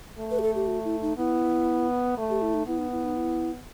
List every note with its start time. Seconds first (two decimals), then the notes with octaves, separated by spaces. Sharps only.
0.18 A3
0.31 B4
0.39 G4
0.43 A4
0.55 G4
0.67 F#4
0.84 E4
1.02 D#4
1.17 B3 E4
2.17 A3
2.30 G4
2.42 E4
2.54 D#4
2.67 B3 E4
2.79 D#4
2.92 E4
3.04 D#4
3.16 E4